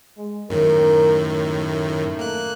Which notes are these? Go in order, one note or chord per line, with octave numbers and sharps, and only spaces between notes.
G#3
F#2 A2 D#3 A#4
A3
A#3 F#6